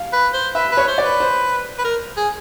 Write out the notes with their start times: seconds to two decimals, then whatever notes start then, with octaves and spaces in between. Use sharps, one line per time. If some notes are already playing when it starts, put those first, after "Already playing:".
Already playing: F5
0.13 B4
0.34 C5
0.55 B4 E5
0.72 B4
0.77 C#5
0.88 C5
0.98 D5
1.05 B4
1.20 C5
1.78 B4
1.85 A#4
2.17 G#4